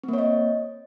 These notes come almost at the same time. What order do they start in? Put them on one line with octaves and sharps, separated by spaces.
C4 A#3 C#5 D#5